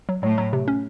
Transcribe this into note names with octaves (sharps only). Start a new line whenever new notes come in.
F#3
A2 F#3
F#3
C3
C#4